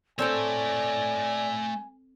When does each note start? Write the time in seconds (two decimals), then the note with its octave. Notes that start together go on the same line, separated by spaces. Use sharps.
0.19 A3 C4 A4 C#5 D5 G5 G#5